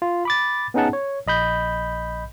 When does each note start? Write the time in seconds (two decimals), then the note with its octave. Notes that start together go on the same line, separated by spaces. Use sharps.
0.02 F4
0.25 B5 D6 A6
0.74 B3 C#4 D#4 G#4 F#5 A5
0.93 C#5
1.27 A#1 D#5 B5 G6